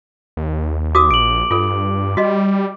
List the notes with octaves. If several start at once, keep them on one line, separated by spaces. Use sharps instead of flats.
D#2
F#4 A#4 D6 D#6
A#1 D7 F#7
G2 F4 A4
G3 F#4 D#5